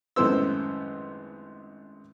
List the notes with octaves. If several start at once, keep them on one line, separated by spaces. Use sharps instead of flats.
G#1 F#2 A2 B3 C5 E6